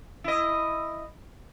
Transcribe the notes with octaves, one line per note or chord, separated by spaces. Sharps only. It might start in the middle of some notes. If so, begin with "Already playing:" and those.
E4 D#5